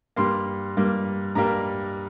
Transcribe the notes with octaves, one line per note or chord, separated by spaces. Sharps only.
G2 G3 A#3 C6
G2 G3 A#3
G2 G3 A#3 A#5